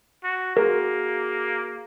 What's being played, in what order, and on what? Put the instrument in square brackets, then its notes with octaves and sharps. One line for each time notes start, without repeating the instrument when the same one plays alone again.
[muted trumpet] F#4
[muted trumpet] A#3 [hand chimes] F#4 G#4 [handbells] A#4